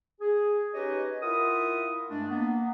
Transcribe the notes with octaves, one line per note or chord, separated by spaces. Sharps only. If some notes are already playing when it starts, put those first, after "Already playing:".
G#4
C#4 D#4 G4 B4 C#5 D#5
E4 F4 A#4 E5 F#5 D#6
G2 G#3 A3 D4
A#3 B3